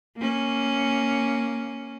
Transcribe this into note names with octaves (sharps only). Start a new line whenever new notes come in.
A#3 C#4